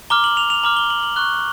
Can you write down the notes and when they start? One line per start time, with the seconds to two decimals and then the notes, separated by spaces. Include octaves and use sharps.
0.10 A#5 D6 F6 G7
0.24 F#7
0.37 F7
0.50 F7
0.63 A#5 D6 F6 F#7
0.77 G7
0.90 F#7
1.03 F#7
1.16 C#6 F#6 G7